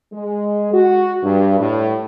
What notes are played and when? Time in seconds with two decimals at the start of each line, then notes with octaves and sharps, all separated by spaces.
0.13 G#3
0.74 F#4
1.23 G2
1.59 A2